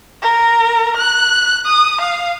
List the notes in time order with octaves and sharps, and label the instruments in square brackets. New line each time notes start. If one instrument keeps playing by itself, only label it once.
[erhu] A#4
F#6
D#6
F5